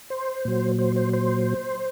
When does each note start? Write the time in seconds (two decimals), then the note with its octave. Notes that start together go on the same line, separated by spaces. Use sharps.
0.10 C5
0.45 A#2 F#3
0.78 C5
0.96 C5
1.13 C5